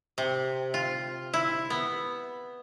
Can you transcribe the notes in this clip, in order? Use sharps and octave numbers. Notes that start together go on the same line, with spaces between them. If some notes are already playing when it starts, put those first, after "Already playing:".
C3
F4
E4
B3